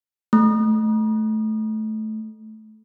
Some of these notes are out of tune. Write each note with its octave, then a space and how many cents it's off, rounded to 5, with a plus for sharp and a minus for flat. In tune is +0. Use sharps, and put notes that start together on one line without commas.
A3 -15